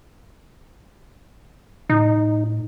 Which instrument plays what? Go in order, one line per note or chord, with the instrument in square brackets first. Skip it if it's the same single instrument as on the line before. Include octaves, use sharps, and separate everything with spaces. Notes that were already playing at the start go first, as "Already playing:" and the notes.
[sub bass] A2 [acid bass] D#4